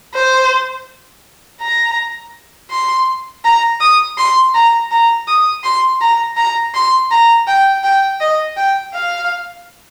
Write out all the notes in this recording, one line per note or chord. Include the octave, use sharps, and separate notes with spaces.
C5
A#5
C6
A#5
D#6
C6
A#5
A#5
D#6
C6
A#5
A#5
C6
A#5
G5
G5
D#5
G5
F5